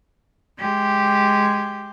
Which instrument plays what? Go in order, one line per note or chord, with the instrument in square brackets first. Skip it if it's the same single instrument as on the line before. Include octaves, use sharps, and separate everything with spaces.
[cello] G#3 G4